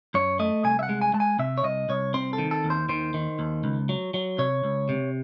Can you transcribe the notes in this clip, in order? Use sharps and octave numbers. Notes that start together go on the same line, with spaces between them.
F#2 C#5
A3 D#5
C2 G#5
E5
F#5
G#3
G#5
G#3 A5
G#5
C3 E5
C#5
C2 D#5
C2 C#5
C4 C5
A4
D#3
A4
D#2
C5
D#3 C5
D#3
D#2
C#2
F#3
F#3
C3 C#5
C#2
C3